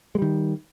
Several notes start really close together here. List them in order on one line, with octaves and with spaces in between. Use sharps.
G#3 G3 D#3